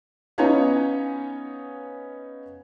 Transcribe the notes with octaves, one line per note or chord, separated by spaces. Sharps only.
B3 C#4 D#4 C#5 F5 G#5